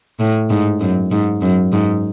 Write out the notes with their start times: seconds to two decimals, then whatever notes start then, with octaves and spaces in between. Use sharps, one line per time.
0.20 A2
0.50 G#2
0.80 F#2
1.11 G#2
1.42 F#2
1.72 G#2